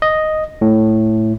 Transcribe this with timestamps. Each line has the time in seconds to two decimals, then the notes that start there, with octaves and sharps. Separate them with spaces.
0.02 D#5
0.61 A2